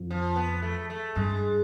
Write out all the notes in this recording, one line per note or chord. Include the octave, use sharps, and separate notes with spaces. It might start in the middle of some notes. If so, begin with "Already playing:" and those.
Already playing: F2
F3
B3
A3
A3
G2 G#3